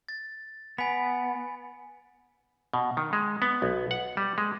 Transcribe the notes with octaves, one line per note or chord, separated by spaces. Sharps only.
A6
B3 G#5 B5
B2
D#3
G#3
B3
B1
F#5
G3
G#3